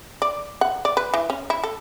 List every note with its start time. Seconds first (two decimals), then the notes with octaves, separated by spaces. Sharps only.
0.22 D5
0.61 F#5
0.85 D5
0.97 B4
1.14 E3
1.30 C#4
1.50 E4
1.64 A4